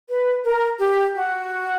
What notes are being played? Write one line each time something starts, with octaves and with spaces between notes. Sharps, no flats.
B4
A#4
G4
F#4